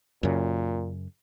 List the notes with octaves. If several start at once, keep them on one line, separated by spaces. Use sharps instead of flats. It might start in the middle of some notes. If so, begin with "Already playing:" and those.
F#2 A#2 C#3